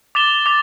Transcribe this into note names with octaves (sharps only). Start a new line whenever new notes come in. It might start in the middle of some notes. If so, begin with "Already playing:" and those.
D6 A6 E7 G7
D6 A6